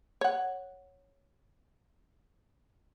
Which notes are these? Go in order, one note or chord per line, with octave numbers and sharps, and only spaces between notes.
C#5 F#5